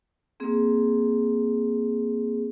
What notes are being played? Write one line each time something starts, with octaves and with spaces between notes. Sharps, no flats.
A#3 C4 G#4